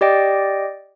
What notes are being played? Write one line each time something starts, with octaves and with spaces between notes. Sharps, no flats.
G4 D5 D#5 G5